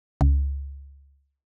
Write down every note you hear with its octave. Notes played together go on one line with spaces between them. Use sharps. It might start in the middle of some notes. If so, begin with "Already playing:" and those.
C#2